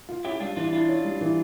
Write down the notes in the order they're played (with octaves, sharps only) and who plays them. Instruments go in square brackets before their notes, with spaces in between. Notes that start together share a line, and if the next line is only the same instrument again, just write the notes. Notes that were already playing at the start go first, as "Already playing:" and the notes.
[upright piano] F4
[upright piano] C#4 [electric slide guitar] E4 G4
[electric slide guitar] G4
[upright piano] G3 [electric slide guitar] D4 F4
[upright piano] E3 [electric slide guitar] D4 F4
[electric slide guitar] D4 F4 [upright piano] E4
[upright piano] C#4
G3
E3